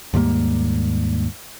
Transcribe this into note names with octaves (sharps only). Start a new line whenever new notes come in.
D#2 G#2 G3 A#3